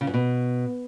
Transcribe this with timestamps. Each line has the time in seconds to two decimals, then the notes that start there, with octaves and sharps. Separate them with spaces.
0.01 C#3
0.07 F#2
0.14 B2